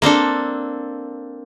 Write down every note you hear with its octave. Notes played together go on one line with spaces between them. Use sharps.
A#3 C4 D4 A4